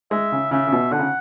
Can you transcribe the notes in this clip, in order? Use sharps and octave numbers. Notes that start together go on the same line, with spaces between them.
G#3 E5
C#3
C#3 E5
C#3
B2
D3 F#5
C#3